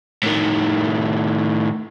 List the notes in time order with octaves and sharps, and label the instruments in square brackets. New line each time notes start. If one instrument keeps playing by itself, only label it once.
[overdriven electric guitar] A2 D#3